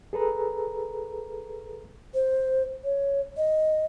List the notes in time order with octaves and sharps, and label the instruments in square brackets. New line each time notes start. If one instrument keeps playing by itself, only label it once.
[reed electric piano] G#4 A4 B4 A#5
[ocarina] C5
C#5
D#5